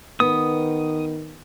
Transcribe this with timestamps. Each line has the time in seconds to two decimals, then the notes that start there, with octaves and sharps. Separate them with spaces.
0.20 D#3 B3 D#6